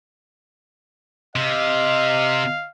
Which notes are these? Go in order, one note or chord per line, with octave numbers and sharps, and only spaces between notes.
C3 D#5 F5